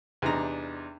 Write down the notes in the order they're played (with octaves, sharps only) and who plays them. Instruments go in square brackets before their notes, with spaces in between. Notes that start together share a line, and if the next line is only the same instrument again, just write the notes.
[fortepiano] E2 C3 D4 D#4 A#5